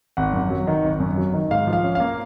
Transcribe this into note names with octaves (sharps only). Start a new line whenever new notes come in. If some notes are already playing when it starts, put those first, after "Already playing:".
G#1 F#5
F#2
F#3
D#3
G#1
F#2
F#3
D#3
G#2 F5
F3
F5
C#4
A#3 F5